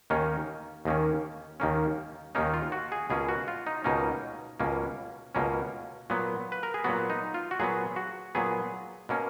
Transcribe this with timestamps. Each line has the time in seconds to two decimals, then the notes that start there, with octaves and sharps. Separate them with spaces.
0.10 D#2 D#3 A#3 C#4 D#4
0.85 D#2 D#3 A#3 C#4
1.60 D#2 D#3 A#3 C#4
2.35 D#2 D#3 A#3 C#4 D#4
2.54 F4
2.72 F#4
2.92 G#4
3.10 C#2 B2 A#3 C#4 G#4
3.29 F#4
3.48 F4
3.67 D#4
3.84 C#2 B2 A#3 C#4 D#4
4.60 C#2 B2 A#3 C#4
5.35 C#2 B2 A#3 C#4
6.10 A#2 F#3 B3
6.52 B4
6.63 A#4
6.74 G#4
6.84 A#2 F#3 B3 F#4
7.10 D#4
7.34 F4
7.51 F#4
7.60 A#2 F#3 B3 G#4
7.96 F#4
8.35 A#2 F#3 B3 G#4
9.09 B2 A#3 C#4